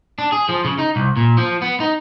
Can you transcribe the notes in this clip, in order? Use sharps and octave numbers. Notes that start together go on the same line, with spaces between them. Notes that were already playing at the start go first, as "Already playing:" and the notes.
D4
G#4
F3
C#3
D#4
C2
A#2
F3
B3
D#4